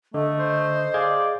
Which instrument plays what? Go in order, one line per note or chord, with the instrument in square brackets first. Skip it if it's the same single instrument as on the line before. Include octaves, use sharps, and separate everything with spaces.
[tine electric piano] D3 [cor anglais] A3 [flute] D#5
[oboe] C5
[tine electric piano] G#4 F5 G#6 [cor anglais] D5